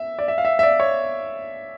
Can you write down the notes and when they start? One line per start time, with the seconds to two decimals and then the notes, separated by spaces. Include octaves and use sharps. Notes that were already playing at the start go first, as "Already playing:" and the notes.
Already playing: E5
0.19 D5
0.28 E5
0.38 F5
0.45 E5
0.59 E5
0.63 D5
0.80 C#5